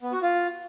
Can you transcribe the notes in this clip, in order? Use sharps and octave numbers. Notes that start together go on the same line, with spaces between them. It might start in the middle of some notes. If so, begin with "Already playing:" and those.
B3
F#4
F4